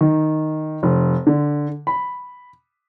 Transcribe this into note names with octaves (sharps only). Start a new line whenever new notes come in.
D#3
F1
D3
B5